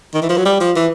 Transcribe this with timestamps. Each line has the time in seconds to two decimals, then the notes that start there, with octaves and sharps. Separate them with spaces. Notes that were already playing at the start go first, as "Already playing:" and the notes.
0.14 D#3
0.22 E3
0.29 F3
0.37 F#3
0.45 G3
0.60 F3
0.76 E3